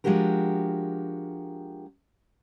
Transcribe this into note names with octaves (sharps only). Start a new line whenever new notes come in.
F3 G#3 D4 F#4 G4 A#4